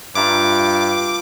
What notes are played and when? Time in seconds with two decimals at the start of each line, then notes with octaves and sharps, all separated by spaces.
0.15 G2 F4 E5 A#5 D6